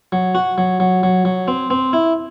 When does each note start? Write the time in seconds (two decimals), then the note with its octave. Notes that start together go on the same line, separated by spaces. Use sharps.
0.12 F#3
0.35 F#4
0.58 F#3
0.80 F#3
1.03 F#3
1.25 F#3
1.48 C4
1.70 C4
1.93 E4